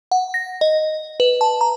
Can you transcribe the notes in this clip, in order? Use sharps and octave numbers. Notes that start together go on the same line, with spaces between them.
F#5
A#6
D#5
B4
A5
A#5